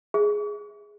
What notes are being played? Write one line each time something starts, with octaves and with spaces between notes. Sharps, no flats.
G#4